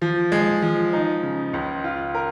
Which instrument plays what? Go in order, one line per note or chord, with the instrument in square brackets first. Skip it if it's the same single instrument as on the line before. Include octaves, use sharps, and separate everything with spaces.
[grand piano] F3
G#3
F3
D#4
C#3
C#2
F4
A#4